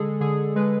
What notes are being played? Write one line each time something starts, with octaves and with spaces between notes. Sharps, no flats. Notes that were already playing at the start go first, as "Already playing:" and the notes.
Already playing: D3 G#3 G#4 A4
D3 G#4
G#3 B4